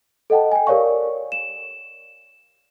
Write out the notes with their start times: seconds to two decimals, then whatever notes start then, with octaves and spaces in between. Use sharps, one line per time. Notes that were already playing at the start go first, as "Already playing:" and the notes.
0.30 A4 D#5 F#5 G5 A5
0.52 G5 G#5
0.67 G4 A#4 C#5 D5 F5 C#6
1.32 E7